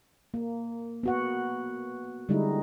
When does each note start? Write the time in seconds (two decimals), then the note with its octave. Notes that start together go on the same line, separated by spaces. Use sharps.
0.34 A#3
1.03 B3 F#4 F#5
2.29 D3 G3 G#3 D#4 E4